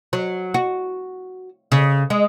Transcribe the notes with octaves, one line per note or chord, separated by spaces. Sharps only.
F#3
F#4
C#3
G#3